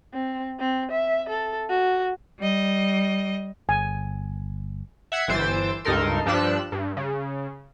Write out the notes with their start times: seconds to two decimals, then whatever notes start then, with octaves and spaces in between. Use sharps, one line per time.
0.14 C4
0.59 C4
0.92 E5
1.29 A4
1.70 F#4
2.39 G3 D#5
3.69 G1 G#5
5.12 E5 F#5 G#6 C7
5.28 G1 E3 C5 E6 A6 D7
5.85 C#2 G2 D#4 A4 A#4 C6
6.26 G2 F3 G3 D4 E6 F#6
6.72 G2
6.97 C#3